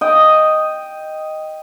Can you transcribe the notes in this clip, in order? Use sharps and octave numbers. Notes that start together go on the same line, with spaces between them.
D#5 G5